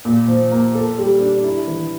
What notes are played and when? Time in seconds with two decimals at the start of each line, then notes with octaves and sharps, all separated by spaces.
0.05 A#2
0.28 F3
0.51 A#3
0.75 A4
0.98 G3
1.21 D4
1.44 E4
1.68 E3